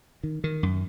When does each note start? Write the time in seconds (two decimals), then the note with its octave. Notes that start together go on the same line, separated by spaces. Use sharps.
0.23 D#3
0.44 D#3
0.63 F#2